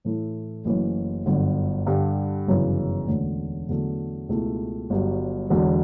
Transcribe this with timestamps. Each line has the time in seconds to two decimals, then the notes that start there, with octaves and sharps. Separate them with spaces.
0.05 A2 E3 A3 E4
0.65 F#1 F#2 E3 A3 C#4
1.26 G1 F#2 D3
1.87 G2 D3 G3
2.47 G1 F#2 C#3 E3
3.08 E1 D2 D3 A3 C#4
3.69 E2 D3 F#3 A3
4.29 C#2 B2 A3 E4
4.90 G1 G2 F#3
5.50 E1 E2 D3 F#3